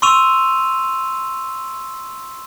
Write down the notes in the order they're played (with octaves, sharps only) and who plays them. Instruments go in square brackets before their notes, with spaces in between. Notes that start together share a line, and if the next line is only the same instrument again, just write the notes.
[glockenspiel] C6 C#6 E6 D#7 F7